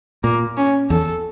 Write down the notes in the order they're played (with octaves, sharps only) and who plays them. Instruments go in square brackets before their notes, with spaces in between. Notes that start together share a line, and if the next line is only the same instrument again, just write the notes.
[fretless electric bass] A#2 [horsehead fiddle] A#3
[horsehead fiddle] C#4
[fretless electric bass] E2 [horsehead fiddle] A4